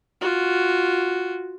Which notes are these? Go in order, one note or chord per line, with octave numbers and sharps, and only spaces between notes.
F4 F#4